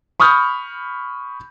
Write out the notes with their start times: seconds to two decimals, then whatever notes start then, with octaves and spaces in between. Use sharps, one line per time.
0.20 B5 C#6 D#6 F6 G6